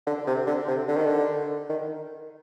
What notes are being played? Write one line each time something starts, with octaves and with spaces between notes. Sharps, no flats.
D3
C3
D3
C3
D3
D#3
D3
D#3